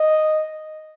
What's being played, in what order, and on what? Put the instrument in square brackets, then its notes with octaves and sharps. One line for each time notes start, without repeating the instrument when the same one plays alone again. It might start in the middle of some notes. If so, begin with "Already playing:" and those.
Already playing: [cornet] D#5